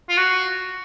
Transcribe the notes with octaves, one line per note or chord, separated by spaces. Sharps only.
F4
F#4